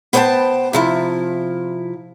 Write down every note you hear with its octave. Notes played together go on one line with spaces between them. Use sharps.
B3 C5 C#5 F#5 G5 A5
C3 F3 E4